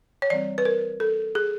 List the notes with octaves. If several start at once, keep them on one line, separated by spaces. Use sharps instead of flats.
C#5
E3 G3 C4 D5
B4
A#4
A4
G#4